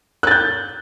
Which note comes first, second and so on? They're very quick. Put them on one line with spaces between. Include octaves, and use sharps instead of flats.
F#6 A6 G6